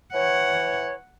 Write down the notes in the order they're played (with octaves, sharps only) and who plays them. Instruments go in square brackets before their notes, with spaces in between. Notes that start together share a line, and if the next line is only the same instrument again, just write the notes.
[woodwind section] E3 C#5 [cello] F#5